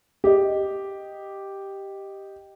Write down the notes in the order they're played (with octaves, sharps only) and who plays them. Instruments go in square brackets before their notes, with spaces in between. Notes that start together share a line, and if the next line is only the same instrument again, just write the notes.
[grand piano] G4 D#5